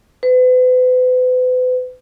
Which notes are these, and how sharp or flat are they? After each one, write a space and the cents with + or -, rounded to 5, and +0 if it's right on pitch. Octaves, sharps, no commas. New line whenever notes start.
B4 +40